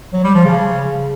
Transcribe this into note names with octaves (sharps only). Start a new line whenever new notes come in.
F#3
G3
F3
C#3